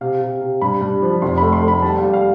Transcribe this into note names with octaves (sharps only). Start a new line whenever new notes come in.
C3 F5
C3
C3
G2 B5
G2
F3
F1 C6
B5
A3
C6
A3
B5
G3 A5
F5
G3
F5